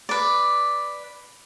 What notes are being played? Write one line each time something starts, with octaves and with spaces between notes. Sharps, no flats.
B4 D5